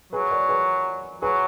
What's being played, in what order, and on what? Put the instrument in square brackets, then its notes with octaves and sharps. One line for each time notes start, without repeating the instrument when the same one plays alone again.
[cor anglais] F#3 [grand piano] G#4 B4
[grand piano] A#4 D5
G#4 B4
[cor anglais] F#3 [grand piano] G#4 B4